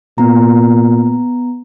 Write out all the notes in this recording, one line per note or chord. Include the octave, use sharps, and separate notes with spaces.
A#2 B3 A#5